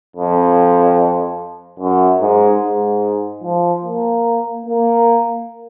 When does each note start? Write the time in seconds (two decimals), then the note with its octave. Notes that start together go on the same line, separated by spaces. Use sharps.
0.16 F2
1.80 F#2
2.21 G#2
2.62 G#2
3.43 F3
3.84 A#3
4.66 A#3